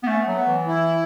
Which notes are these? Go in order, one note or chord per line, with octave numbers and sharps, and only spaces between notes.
B3
A3 C#4
B3
F#3 A3
B3
E3
E4